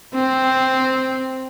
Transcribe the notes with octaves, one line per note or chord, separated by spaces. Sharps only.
C4